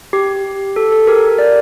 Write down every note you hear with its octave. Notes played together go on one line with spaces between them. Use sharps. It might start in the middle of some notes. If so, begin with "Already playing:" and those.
G4
A4
A4
G4 A#4
A#4 D5